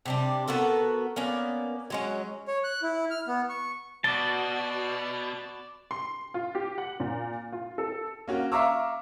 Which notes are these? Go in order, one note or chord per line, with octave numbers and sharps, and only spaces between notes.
C3 G3 D4
B3 F#4 A4 A#4
A#3 B3 C#4 D5
F#3 G#3 C#4
C#5
F#6
E4
F6
B3
C#6
B2 F#4 D5 A5 D6 G7
C6
F4
G4
F#5
A#2
F4
A4
A#3 C#4 F#4
E5 F5 A#5 C#6 D6 E6